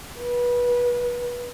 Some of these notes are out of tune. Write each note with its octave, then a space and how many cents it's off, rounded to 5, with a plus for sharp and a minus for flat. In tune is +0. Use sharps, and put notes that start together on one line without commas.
B4 -25